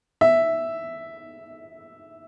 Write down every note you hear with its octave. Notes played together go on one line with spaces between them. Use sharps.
E5